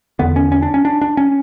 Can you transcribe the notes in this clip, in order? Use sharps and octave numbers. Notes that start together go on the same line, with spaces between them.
E2 D3 B3
C#4
C#4
D4
C#4
D4
D4
C#4